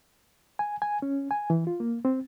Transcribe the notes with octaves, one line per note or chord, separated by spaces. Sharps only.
G#5
G#5
C#4
G#5
E3
F4
A#3
C4